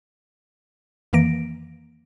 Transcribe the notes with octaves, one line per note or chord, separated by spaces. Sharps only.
F2 D#3 E3 A#3 A#6 D7